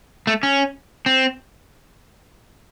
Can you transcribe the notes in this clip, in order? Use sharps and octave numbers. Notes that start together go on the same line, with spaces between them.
A3
C#4
C4